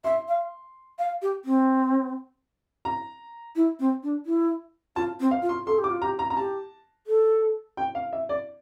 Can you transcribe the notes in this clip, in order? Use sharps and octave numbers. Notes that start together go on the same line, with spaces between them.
E5 C6
F5
F5
G4
C4
A#5
E4
C4
D4
E4
F4 A5
C4
F5
F4
C6
A4 C6
G4
D6
F4
G4 A#5
A#5
A#5
G4 A5
A4
G5
F5
E5
D5